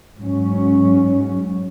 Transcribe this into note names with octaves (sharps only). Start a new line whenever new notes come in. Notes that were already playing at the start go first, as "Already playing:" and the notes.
G#2 F#3 C#4